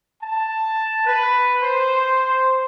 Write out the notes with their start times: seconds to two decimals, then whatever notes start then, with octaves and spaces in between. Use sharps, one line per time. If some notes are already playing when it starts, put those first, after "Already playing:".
0.22 A5
1.05 B4
1.63 C5